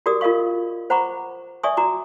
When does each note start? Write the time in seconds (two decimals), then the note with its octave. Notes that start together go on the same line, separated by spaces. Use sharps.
0.06 F#4 G4 A#4 D5 D6 D#6
0.21 F4 A#4 D#5 F5 C#6
0.90 C5 F#5 A#5 B5 C#6 D6
1.63 D5 E5 G#5 C#6 D#6
1.77 F#4 A#5 D6